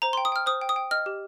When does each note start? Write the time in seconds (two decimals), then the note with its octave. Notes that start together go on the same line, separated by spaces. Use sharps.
0.02 C5 A#5
0.13 C6
0.17 G5
0.25 D#6
0.32 G5 F6
0.46 C5 D#6
0.61 G5
0.69 D#6
0.76 G5
0.91 D#5 F6
1.06 G4